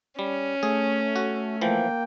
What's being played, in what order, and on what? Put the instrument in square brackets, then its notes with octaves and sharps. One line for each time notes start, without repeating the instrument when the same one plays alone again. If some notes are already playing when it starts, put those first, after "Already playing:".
[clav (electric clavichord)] G3 [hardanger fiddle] C#4
[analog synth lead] A3 [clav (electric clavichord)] G#4
[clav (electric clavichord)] F#4
[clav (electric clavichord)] E3 F3 [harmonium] A#3 G5